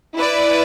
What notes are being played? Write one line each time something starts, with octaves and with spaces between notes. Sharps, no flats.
E4 B4 D5